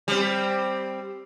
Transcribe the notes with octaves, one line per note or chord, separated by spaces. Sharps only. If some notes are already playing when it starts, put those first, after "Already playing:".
G3 C4